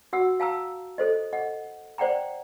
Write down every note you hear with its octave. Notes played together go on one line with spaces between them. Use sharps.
F#4 F#5 E6
F5 A5 A#5 E6
A4 C5 D#5
D#5 F#5
C5 D5 F#5 G5 A#5